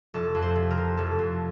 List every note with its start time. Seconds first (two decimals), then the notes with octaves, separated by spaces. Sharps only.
0.14 F1 A4
0.35 F2
0.42 C5
0.55 C3
0.71 A#4
0.78 C3
0.97 F1 A4
1.19 F2